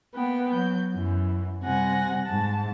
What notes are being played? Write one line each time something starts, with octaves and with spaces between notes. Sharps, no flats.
A#3 B3 B4 G5
F#3 G6
F#2 E3
C3 G3 F#5 G#5 A#6
G#2 A5